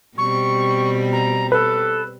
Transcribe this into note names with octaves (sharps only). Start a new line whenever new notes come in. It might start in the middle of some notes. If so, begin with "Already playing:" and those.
B2 G3 C4 C#6
A#5
A4 B4